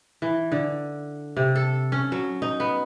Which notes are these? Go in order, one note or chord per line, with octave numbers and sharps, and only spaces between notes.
E3
D3
C3
A4
C#4
F#3
D#4
B3